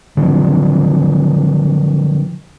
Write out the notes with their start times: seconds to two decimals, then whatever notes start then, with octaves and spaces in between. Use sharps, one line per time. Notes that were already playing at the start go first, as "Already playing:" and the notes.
0.17 D3 F3 F#3 C4